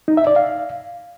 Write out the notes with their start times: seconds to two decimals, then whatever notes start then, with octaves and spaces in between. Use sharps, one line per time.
0.08 D#4
0.17 E5
0.27 D5
0.36 F5